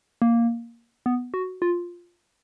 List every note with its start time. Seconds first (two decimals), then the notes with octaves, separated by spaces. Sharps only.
0.22 A#3
1.06 B3
1.34 F#4
1.62 F4